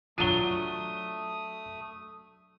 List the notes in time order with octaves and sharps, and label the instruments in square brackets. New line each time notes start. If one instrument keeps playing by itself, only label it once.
[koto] F#3 D4 [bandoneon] A3 D#6 [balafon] F4 [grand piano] D#7 G7